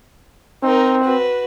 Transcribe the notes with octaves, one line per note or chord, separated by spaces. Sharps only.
C4 D#4 A#4
F#4 B4